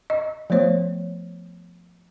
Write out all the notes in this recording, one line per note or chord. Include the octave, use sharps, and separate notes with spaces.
D#5
F3 A3 B3 C5 C#5